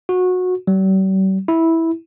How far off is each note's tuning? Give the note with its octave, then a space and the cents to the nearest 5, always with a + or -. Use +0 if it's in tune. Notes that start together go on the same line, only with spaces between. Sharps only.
F#4 -20
G3 -45
E4 -10